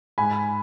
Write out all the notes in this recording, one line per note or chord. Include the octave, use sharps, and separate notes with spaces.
G#2 G#5 B5